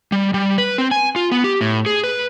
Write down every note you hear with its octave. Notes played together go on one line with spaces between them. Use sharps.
G3
G3
B4
C4
G#5
F4
B3
G4
A2
G#4
B4